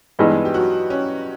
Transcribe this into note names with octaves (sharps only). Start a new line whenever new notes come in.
G2 E3 G#3 B3 D#4
G4
F#3 F#4
C#4